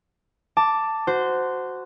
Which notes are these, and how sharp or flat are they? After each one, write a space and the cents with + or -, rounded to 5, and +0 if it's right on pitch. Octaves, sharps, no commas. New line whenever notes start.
A5 +10 D6 +0
F#4 +0 C5 -15